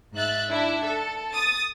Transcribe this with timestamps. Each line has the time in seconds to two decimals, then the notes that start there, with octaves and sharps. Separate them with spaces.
0.14 G#2 E5 F#6 A6
0.50 D4 E4 E5
0.85 A4
1.32 D#6 A6